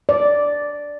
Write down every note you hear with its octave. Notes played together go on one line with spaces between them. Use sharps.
D5